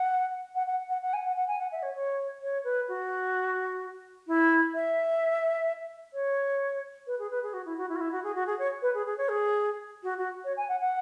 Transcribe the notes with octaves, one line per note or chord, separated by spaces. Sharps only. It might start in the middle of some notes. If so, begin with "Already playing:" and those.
Already playing: F#5
F#5
F#5
F#5
F#5
G#5
F#5
F#5
G#5
F#5
E5
C#5
C#5
C#5
B4
F#4
E4
E5
C#5
B4
G#4
B4
G#4
F#4
E4
F#4
E4
F#4
E4
F#4
G#4
F#4
G#4
C#5
B4
G#4
G#4
C#5
G#4
F#4
F#4
C#5
G#5
F#5
F#5